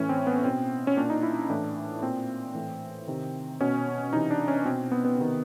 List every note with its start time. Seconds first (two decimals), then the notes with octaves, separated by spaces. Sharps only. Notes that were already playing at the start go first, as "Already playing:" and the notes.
Already playing: A2 E3 C#4
0.09 C4
0.27 B3
0.44 B2 C4
0.87 C#4
0.97 A#2 D4
1.10 D#4
1.23 E4
1.50 A2 E3 D4
2.03 A#2 C4
2.54 A2 E3
3.08 C3 D#3
3.61 B2 C#4
4.13 C3 E3 D#4
4.31 D4
4.48 C#4
4.65 B2 C4
4.92 B3
5.05 B3
5.18 C3 D#3